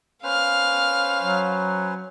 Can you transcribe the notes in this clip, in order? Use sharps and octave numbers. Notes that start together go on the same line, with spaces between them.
C#4 B4 C5 F5 F6
F#3